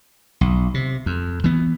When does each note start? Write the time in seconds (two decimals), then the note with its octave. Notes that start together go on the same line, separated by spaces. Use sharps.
0.41 B1
0.74 C3
1.06 F2
1.44 E3 B3